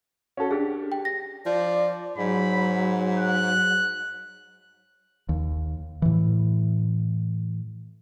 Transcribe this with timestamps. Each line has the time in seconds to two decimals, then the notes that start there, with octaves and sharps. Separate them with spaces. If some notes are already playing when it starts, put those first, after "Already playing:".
0.37 C#4 F#4 A4
0.51 D4 G4 G#4
0.92 G5
1.05 A#6
1.46 F3 D5
2.18 G#2 F#3 B5
3.19 F#6
5.29 D#2
6.02 A2 E3